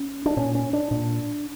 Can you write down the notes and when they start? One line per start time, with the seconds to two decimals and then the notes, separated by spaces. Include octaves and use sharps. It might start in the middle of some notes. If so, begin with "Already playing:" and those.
Already playing: C#4
0.26 D4
0.37 A#2 C#4
0.55 C#4
0.73 D4
0.91 A#2 D4